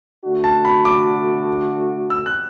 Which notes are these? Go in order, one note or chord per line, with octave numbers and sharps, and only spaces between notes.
D3 A3 D4 F#4
A5
B5
D6
E6
F#6